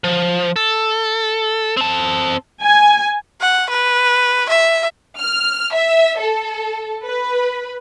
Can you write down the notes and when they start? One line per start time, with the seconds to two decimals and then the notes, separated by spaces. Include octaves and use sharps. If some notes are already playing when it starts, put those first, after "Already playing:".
0.04 F3
0.56 A4
1.77 C4 A5
2.64 G#5
3.41 F#5
3.70 B4
4.50 E5
5.18 F6
5.74 E5
6.19 A4
7.04 B4